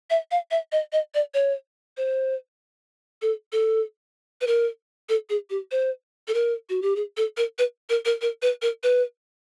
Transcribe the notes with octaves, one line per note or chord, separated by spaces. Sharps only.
E5
F5
E5
D#5
D#5
D5
C#5
C5
A4
A4
B4
A#4
A4
G#4
G4
C5
A4
A#4
F#4
G4
G#4
A4
A#4
B4
A#4
A#4
A#4
B4
A#4
B4